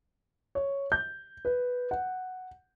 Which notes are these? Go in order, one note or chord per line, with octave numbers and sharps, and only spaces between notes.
C#5
G6
B4
F#5